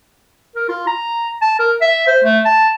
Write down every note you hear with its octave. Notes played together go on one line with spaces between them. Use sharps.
A#4
F4
A#5
A5
A#4
E5
C5
A3
A5